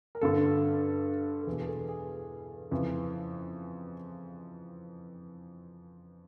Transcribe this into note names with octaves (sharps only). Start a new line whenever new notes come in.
A#4
G2 D3 A4
A4
E2 B2 G#4
G#4
A4
G#4
F2 C#3 E3